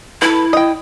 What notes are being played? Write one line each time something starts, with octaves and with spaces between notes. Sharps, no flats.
E4 A4 B4
D#5 G5